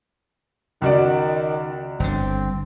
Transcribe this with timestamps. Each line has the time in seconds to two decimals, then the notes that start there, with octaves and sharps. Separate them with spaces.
0.82 C#2 D#3 F#4 D5
2.00 G1 D3 C4